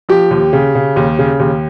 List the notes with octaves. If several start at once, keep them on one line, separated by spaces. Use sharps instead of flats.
F3 G4
D#2
C#3
C#3
D#2
C#3
D#2